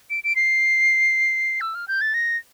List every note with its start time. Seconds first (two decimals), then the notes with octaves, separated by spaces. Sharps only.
0.10 D7
0.24 D7
0.36 C7
1.61 E6
1.75 F6
1.88 G6
2.01 A6
2.14 A#6